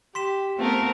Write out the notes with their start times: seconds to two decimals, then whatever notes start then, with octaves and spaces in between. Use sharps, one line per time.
0.15 G4 C6 B6 E7
0.59 A3 B3 C4 F4 A#4